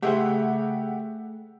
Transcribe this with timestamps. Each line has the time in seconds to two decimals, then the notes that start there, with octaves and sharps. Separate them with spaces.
0.02 C#3 A3 G4 G#4 C5 E5 F#5